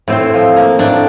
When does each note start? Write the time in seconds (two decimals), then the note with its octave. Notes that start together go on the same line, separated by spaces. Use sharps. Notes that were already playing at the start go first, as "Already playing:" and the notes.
0.08 A2 C4 C5
0.34 F3
0.56 A#3
0.79 A2 D4 D5